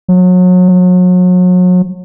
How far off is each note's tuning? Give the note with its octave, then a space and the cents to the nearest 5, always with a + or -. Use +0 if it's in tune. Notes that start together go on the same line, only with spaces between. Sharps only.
F#3 -30
F#3 -35